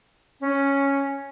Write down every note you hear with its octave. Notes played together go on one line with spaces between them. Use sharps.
C#4